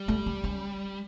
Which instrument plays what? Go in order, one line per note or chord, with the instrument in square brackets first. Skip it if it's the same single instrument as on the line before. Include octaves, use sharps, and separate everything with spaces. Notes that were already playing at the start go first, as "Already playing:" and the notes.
Already playing: [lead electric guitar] G3
[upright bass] A3
A3
C#4